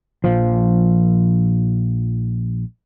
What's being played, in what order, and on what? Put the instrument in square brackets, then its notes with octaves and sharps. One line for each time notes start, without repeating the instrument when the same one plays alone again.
[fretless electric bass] A#1 F3